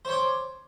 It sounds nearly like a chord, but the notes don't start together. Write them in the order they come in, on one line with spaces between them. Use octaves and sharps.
C5 C#5 C6 D6